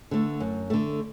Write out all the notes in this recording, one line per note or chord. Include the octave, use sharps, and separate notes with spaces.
D3 A3
F#2
D3 A3